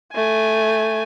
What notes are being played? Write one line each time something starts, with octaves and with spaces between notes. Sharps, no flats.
A3 G#5